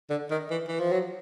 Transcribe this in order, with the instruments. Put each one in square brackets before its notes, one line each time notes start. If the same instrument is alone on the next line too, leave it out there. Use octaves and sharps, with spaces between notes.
[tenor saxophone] D3
D#3
E3
E3
F3
F#3